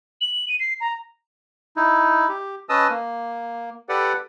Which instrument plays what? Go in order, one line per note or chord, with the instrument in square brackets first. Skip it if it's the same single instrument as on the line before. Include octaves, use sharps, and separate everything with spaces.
[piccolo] F#7
D#7
C7
A#5
[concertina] D#4 E4
G4
C#4 B4 D#5 A5 D#6 E6
A#3
G4 A4 B4 D5 F#5